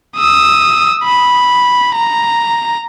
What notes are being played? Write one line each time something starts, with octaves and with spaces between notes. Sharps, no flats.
D#6 E6
B5
A#5